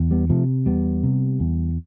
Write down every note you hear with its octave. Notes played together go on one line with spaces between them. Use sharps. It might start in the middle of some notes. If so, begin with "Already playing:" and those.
Already playing: E2
G3 B3
C3 F3 A3
E2 G3 B3
C3
E2